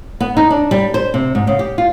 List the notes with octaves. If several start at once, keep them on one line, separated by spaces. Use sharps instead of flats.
B3
D#4
D4
G3
C5
C3
G#2
C#3
G4
F4